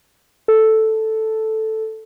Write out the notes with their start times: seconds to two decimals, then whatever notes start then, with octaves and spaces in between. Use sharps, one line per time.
0.48 A4